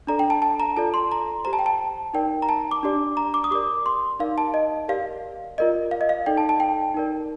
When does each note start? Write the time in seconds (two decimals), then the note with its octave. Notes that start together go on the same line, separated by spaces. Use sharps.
0.07 D4 A4 D5 A#5
0.19 G5
0.30 A5
0.42 A5
0.60 A#5
0.77 F4 A4 D5 A5
0.94 C6
1.12 A#5
1.45 G4 C5 A#5
1.53 A5
1.59 G5
1.66 A5
2.14 D#4 A#4 D5 G5
2.42 A#5
2.49 A5
2.71 D6
2.83 D4 G4 D5
3.17 A#5
3.34 D6
3.44 D#6
3.51 G4 A#4 D5 D6
3.86 C6
4.19 D#4 A#4 D5 F5
4.38 A5
4.54 D#5
4.88 G4 A#4 D5 F5
5.58 F4 A#4 D5 D#5
5.91 F5
6.01 D#5
6.09 F5
6.26 D#4 A4 D5 G5
6.37 A5
6.49 A5
6.60 G5
6.94 D#4 A#4 D5